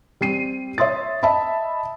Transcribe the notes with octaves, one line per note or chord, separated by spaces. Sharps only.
G3 C4 C7 D#7
C#5 E5 C6 D#6 A6
D#5 E5 A5 B5